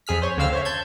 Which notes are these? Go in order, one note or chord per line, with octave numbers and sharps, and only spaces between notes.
F2 G#4 F6 B6
C5 C#5
D2 C#3 C4 F5 E6 F6
C5 C#5 E5
A5 G6 G#6